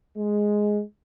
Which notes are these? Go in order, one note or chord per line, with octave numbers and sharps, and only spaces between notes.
G#3